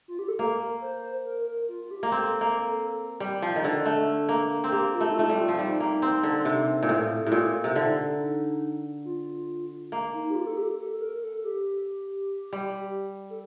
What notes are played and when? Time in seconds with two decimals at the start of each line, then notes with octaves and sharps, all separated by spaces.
0.08 F4
0.19 G4
0.28 A4
0.39 A#3 A#4
0.82 C5
1.25 A#4
1.47 A#4
1.69 F4
1.85 F4
1.91 G4
2.03 A#3
2.12 C4 A4
2.41 A#3
2.55 A4
3.20 G3
3.42 F3
3.56 D#3
3.64 D3
3.86 A3
4.29 A#3
4.64 C4 A4
4.72 A#3 G4
4.94 F4
5.01 A3
5.11 D#4
5.16 A3 F4
5.30 G3
5.37 F4
5.48 F3
5.59 G3 D#4
5.80 A#3
6.02 C4
6.23 D3
6.45 C3
6.83 A#2
6.89 A2
7.23 A2 G4
7.32 A#2 F4
7.64 C3
7.75 D3 D#4
9.05 F4
9.92 A#3
10.14 D#4
10.30 G4
10.35 F4
10.47 A4
10.57 G4
10.78 A4
11.00 A#4
11.22 A4
11.44 G4
12.53 G3
13.30 A4